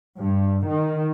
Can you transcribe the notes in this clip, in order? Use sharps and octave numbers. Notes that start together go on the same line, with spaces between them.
G2
D#3